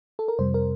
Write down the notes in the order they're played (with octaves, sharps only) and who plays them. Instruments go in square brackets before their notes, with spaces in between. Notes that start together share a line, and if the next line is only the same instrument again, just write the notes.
[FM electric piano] A4
A#4
F2 C3 G3 C5
A#4